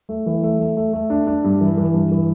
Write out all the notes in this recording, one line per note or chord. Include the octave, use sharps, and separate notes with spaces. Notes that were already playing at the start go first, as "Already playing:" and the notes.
A3
E3
A3
A3
A3
A3
D4
D4
G2
E3
E3
G2
E3